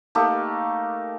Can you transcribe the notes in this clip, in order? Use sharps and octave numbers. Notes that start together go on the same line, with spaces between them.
A3 A#3 D#4 G4